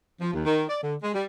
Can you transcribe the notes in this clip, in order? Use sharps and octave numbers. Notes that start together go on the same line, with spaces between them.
F3
D#2
D#3
D5
D3
G#3
G3